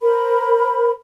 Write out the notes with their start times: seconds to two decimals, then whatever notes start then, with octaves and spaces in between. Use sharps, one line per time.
0.01 A#4 C5 B5